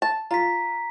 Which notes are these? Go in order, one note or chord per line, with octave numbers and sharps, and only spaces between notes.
A5
F4 A#5 B6